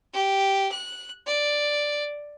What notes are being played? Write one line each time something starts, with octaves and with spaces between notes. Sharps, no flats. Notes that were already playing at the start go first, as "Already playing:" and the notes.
G4
F#6
D5